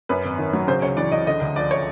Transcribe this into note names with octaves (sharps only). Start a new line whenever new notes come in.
F#2 B4
G#1
D#3
F#3
C#3 C5
C#2 C#5
E3 D5
C#2 D#5
D3 D#5
D2
F3 D5
C#5